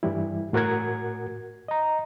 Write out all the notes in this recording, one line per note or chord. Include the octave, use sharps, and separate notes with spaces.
G2 E3 G3 E4
A2 F#4 A#4 F#5 G#6
D#5 A#5